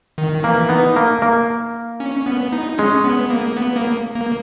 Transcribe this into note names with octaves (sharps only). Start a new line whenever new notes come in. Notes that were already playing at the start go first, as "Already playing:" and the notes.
D#3
E3 A#3
B3 D#4
A#3
A#3
C#4
B3
D#4
G#3 C#4
B3
A#3
B3
A#3
A#3